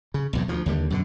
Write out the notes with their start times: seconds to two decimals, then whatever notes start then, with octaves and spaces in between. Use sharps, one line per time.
0.14 C#3
0.33 B1 E2 A2
0.48 D2 F3
0.66 D#2 D3 G3
0.90 F#2 B2 D3